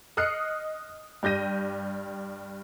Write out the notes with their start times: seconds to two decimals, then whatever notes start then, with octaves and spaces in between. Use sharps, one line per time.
0.17 D#5 D#6 F6 F#6 C7 C#7
1.23 G2 G4 G6 A#6 D#7